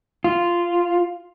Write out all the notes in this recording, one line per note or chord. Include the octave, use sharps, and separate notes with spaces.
F4